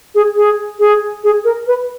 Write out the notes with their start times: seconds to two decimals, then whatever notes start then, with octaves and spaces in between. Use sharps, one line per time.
0.15 G#4
0.36 G#4
0.79 G#4
1.24 G#4
1.45 A#4
1.67 B4